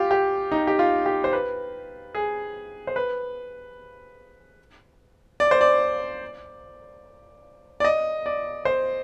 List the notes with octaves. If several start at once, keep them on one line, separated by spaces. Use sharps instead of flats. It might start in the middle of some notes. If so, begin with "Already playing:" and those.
Already playing: F4 G4
G4
D#4
G4
F4
G4
C5
B4
G#4
C5
B4
D5
C5
D5
D5
D#5
D5
C5